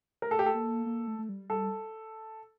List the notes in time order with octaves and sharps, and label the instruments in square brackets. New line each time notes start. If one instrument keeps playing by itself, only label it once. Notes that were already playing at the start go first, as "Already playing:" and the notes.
[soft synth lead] A3 [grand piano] A#4
[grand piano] A4
G4
A4
[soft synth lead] A#3
A#3
A3
A3
G3
[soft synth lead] G3 [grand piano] A4